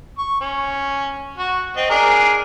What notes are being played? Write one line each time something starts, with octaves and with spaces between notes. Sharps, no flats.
C#6
C#4
F#4
C4 D#5
D4 G#4 A#4